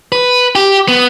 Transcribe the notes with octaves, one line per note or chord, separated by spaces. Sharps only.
B4
G4
B3